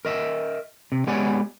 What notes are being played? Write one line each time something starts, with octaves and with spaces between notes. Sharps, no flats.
A#4 D#5 E5
C3
G#3 B3 G4 C#5 D5 G#5